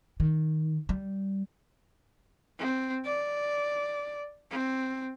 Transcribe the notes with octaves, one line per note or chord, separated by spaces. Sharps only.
D#3
G3
C4
D5
C4